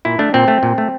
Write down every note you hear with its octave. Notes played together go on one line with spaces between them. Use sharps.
A#2 E4
A3 D4
A#2 C4
A3
A#2
A3